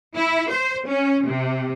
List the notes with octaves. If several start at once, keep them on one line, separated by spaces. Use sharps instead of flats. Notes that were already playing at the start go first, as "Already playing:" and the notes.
E4
C5
C#4
C3